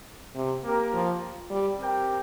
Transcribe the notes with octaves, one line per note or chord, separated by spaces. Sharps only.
C3
A#3 G4 A#4
F3
G3
C4 G4 A#4 G5